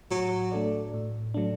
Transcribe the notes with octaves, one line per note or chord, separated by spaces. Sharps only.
A2 F#3
A3 D4 A4 D5
A2
F#3 A3 D4